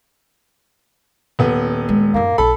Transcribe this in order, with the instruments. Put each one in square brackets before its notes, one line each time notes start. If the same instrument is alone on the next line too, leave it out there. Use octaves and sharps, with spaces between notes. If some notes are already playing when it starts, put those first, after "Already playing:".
[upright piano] D#1 B3
[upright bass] G#3
[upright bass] F#2 D#4 [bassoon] A#3
[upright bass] B1 D#4 [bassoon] A4 [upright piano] B5